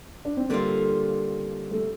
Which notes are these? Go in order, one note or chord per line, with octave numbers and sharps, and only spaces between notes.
D4
C4
D3 G3 A#3 C4 F4
A3